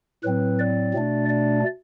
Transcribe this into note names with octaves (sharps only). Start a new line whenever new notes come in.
A2 F#3 C4 B4
D5
B2 A3 D4
D5